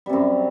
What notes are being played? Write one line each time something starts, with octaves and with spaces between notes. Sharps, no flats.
F#2 C3 G3